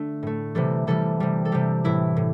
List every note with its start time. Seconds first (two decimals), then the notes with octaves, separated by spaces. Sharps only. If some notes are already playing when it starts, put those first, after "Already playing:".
Already playing: D3 A3
0.23 A2 A3
0.55 C3 E3 G3 A4
0.87 C3 E3 G3 A4
1.20 C3 G3
1.45 A4
1.52 C3 G3 G4
1.84 A2 E3 G3 E4
2.17 A2